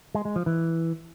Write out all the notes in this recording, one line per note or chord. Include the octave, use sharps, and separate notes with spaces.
G#3
G#3
F3
E3